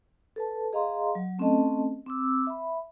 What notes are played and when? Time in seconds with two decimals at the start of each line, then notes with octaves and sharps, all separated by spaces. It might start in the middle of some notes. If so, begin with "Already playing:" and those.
0.36 A4 B4 A5
0.73 G#4 D#5 F5 A#5 C6
1.15 F#3
1.39 A3 C4 C#4 A4 D#5 A5
2.06 C4 D6 E6
2.47 E5 B5